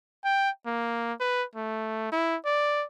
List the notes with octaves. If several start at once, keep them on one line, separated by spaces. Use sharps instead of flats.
G5
A#3
B4
A3
E4
D5